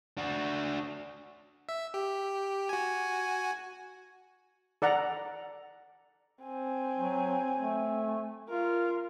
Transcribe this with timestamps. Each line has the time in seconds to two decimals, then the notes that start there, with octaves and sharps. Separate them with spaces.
0.17 D4 F#4
1.69 E5
1.94 G4
2.69 F#4 G#5
4.82 A4 D5 F#5 A#5
6.43 C4 G#5
6.98 F#3
7.58 A3
8.49 F4 A#4